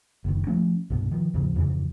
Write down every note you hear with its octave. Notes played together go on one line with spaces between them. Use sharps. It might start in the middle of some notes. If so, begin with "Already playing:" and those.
F#1 D#3
F3 A3 C#4
C2 G2 B2
D#3 F3
D#2 G#2 C#3 F3
F2 G#2 C#3 E3